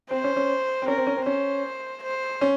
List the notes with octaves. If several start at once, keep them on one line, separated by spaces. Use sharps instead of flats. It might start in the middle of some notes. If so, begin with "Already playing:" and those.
C4 C5
C#4
C#4
C4
C#4 A#4
C4
C#4
C4
C#4 C5
C5
C#4